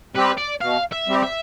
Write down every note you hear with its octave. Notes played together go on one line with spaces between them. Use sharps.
G3 C4 G4 B4
D5
B2 F5
E5
G3 C4 G4
E5